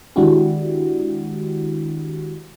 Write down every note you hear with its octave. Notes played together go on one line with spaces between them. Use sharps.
D#3 G#3 D4 E4 F#4 G4